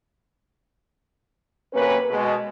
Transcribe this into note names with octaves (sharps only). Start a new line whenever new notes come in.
F#2 C3 A#3 C#4 B4
B2 G#3